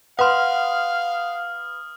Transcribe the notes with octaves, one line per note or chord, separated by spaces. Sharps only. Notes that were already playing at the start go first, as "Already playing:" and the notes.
B4 F5 F#5 C6 D#6 F6